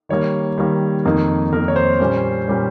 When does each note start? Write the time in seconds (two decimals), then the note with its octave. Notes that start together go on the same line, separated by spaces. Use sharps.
0.09 D#3 G3 A#3 C#5
0.58 D#3 G3 A#3
1.05 F2 D#3 A#3 D#4
1.52 F2 D#3 A#3 D#4 A#4
1.68 C#5
1.76 C5
2.00 A#2 G3 C#4
2.48 A#2 G3 C#4